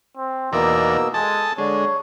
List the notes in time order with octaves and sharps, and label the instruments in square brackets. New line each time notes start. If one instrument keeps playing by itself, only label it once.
[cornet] C4
[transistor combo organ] E2 A#4 D5 [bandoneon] B2 A#3 E6 [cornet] D#4
[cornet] G#3 [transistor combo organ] A4 A5 [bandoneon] G#5 D#6
[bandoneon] D3 D4 [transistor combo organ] G#3 [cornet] C#5